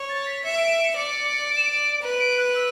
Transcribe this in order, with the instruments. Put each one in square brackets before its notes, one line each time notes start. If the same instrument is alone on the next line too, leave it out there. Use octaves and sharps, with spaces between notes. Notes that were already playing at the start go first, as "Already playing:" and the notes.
Already playing: [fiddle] C#5
[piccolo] A6
B6
[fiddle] E5 [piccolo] C#7
[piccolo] D7
D7
C#7
[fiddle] D5 [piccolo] C#7
[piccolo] D7
E7
D7
[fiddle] B4
[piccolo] D7
F#6
E6